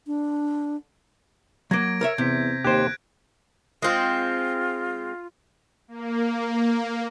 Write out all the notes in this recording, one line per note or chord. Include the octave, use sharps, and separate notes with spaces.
D4
F#3 A#3 G#6 A#6 D7
A#4 C#5 E5 D7
E2 C3 G6 B6
D#2 G4 C5 F#6 G#6 D7
G#3 C4 F4
A#3